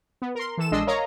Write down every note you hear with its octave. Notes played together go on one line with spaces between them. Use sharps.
B3
A#4 C6
E3 A4 E7
A#1 G#3 D4 D#5 C6 E6
A#4 C#5 D#5 F5 A#5